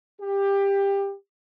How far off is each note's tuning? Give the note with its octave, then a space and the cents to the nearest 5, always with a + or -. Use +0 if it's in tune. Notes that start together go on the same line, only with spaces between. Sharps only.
G4 +20